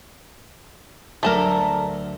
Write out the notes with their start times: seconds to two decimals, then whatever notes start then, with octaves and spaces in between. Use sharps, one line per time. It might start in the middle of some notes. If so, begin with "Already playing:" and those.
1.23 D2 F#3 A3 A4 A#4 D5